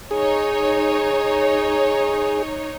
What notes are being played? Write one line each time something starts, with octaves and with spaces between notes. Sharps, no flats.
D#4 G#4 C#5